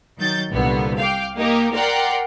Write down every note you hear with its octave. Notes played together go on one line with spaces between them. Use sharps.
D#3 F#3 G6 A6
C2 A#2 D3 B3
F5 G5 D6
A#3 D#4 G4 A#4
A#4 D5 F#5 G5 C6